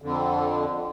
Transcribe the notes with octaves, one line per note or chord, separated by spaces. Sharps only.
F2 D3